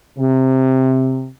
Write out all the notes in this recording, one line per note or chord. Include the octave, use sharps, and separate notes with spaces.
C3